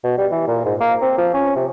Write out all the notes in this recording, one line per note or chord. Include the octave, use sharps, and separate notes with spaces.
B2
G3
E3
A#2
G#2
A#3
C4
F3
C#4
C3